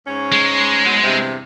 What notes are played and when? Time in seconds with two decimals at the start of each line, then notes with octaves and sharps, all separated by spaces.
0.07 G#2 C#4
0.32 G#3
0.86 G#2 B2 F#3
1.03 E2 G2 C3